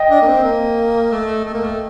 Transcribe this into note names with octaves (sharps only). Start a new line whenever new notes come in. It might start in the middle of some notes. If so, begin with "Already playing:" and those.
Already playing: D#5 G5
D4
A#3
C4
A#3
A3
A3
A#3
A3